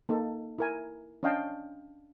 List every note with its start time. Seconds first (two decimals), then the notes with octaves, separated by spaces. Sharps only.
0.09 A#3 D#4 A4
0.58 E4 A#4 G#5
1.23 C#4 D4 D#5 F5 G5 A5